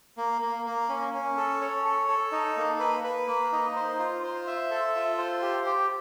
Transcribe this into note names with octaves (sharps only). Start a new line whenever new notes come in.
A#3
A#3
A#3
C#4
C#4
A4
C#5
A4
A4
D#4
A#3
B4
B4
A#3
D#4
C5
F4
C5
E5
A4
F4
C5
G4
G4